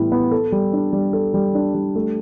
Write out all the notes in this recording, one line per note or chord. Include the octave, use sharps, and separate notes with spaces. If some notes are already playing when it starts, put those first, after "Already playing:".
Already playing: A2 E3 G3 B3
B3
A4
G3
D4
G3
A4
G3
D4
G3
A3